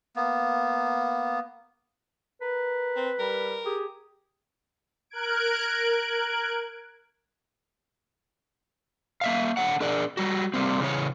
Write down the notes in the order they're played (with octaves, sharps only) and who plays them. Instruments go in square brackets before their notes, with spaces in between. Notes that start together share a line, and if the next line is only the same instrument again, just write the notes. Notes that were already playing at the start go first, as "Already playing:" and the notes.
[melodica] A#3 B3
[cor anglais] A#4 [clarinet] B4
[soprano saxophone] C4
[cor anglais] G3 [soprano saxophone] A#4
[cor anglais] G4 [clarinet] G#4
[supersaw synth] A#4 F#6 G#6 D7
[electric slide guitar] A#3 E5 F5
D3 C#5 F#5
D4 G#4 A#4 D5
G3 F#4
G3 A#3 C4
C#3 E3 C#5